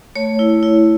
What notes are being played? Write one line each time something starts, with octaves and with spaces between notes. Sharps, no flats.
A3 C#5
E4
E4